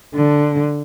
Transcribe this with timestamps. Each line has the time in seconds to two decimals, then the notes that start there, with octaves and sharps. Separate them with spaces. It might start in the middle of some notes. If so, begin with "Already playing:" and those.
0.15 D3